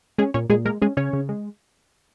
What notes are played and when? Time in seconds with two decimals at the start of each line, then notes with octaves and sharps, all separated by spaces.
0.18 G#3 C#4 G#4
0.34 A#2 C#4 C#5
0.50 A#2 G#3 G#4
0.65 G#3 A#3 A#4
0.82 G#3 C#4 G#4
0.97 C#3 C#4 C#5
1.13 C#3
1.29 G#3